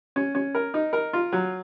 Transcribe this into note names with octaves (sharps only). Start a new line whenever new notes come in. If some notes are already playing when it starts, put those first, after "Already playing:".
C#4
C#4
A#4
D#4
A#4
F4
F#3